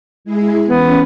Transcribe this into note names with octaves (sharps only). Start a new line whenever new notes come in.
G#3 E4 G#4
E3 B3 C#4